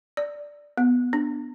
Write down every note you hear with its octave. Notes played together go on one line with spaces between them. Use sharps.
D5
B3
D4